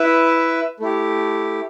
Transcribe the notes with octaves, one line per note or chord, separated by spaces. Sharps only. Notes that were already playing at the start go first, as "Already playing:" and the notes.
Already playing: E4 B4 E5
A3 E4 G4